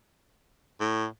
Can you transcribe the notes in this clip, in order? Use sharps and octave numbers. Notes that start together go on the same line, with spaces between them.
A2